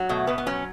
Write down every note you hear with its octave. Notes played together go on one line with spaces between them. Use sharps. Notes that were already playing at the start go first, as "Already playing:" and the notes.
Already playing: F#3
B2 A3
B2 B3
B3
F#3 C#4